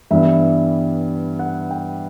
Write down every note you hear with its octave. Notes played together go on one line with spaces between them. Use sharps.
G2 E3 G3 B3 E5
F#5
G5